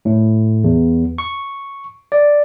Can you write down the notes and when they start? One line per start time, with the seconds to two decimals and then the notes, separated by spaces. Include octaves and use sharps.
0.05 A2
0.64 E2
1.18 C#6
2.12 D5